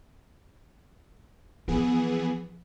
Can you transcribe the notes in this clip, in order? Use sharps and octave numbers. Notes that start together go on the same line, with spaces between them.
E3 F3 B3 G#4